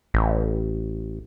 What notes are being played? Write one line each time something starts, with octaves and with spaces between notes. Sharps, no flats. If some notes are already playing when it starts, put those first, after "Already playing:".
A1